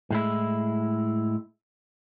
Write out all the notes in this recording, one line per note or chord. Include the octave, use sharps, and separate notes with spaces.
A2 G#3 E4